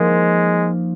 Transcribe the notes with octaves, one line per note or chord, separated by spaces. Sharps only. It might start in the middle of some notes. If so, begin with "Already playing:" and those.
Already playing: F3 G#3 A#3 D#4